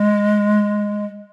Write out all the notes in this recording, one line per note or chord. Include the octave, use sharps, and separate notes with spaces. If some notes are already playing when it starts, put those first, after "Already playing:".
Already playing: G#3